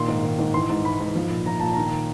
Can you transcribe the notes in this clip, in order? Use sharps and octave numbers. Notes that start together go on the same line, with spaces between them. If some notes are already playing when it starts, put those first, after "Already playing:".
Already playing: A#2 D#3 C6
G#2
D#3
G#2
E3 C6
G#2
E3 B5
G#2
F3
A#2
F3 A#5
A#2 A5
D#3 A#5